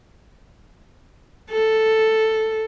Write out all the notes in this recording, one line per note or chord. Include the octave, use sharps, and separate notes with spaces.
A4